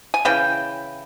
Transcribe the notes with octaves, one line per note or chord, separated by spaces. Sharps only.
G#5
C#3 E3 G5